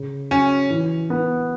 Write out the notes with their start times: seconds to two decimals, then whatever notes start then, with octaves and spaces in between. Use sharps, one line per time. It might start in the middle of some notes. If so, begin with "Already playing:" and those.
Already playing: C#3
0.31 F#3 C#4
0.70 E3
1.10 B3